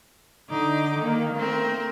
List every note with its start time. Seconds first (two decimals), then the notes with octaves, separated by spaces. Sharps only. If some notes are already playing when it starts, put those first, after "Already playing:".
0.49 D3 D#4 D6
0.96 D#3 A#3
1.34 A3 C4 A#4